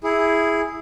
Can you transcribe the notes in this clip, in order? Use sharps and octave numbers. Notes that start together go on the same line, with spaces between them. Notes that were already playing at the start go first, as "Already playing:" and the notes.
E4 G#4